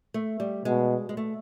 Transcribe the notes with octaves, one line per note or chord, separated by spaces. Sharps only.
A3
G3
B2 G#3
G#3
A3